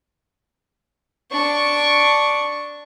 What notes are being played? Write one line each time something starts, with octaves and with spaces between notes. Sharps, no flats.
D4 C#6